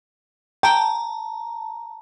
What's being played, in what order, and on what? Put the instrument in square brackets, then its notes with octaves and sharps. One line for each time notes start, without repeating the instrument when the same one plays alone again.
[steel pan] G5 [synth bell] A5 A#5